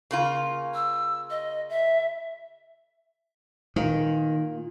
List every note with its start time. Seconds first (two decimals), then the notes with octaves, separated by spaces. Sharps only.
0.11 C#3 A#3 F4
0.74 E6
1.30 D#5
1.70 E5
3.76 A#2 D#3